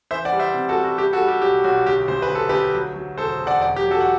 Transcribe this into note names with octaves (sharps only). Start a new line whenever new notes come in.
E3 C5 E5
D5 F#5
G3
C5 E5
C3
F#4 A4
G3
F#4
G3 G4
F#4 A4
G3
G4
B1 G4
B1 F#4
D2 G4
D2 C5
B4
D2
A4
D2 G4 B4
F#3
F#3
E1 A4 C5
E1
D5 F#5
E1 D5 F#5
G4
F#3
F#4 A4
F#5